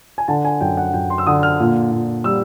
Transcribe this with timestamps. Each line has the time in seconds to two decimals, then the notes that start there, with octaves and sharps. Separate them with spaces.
0.18 G#5
0.28 D3 A5
0.45 G#5
0.61 F#2 G5
0.77 F#5
0.93 F#2 G5
1.10 C6
1.18 E6
1.27 D3 D#6
1.43 F6
1.60 A#2
1.92 A#2
2.24 G3 E6